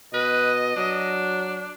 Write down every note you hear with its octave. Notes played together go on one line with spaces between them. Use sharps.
B2 B4 D#5
F#3 D4